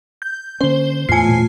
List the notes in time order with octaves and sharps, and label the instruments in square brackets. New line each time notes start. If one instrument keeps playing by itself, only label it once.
[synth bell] G6
[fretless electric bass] D3 C#4 [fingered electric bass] A#3 D4 [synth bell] C5 G7
[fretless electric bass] E2 A2 [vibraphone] A3 F4 [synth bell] G#5 C7
[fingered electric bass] E1 A#2